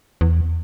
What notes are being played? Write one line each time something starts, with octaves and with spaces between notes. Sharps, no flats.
E2